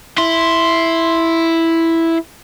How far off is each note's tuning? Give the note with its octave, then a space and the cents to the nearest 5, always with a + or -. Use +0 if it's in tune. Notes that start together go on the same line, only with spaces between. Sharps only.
E4 +0 C6 +0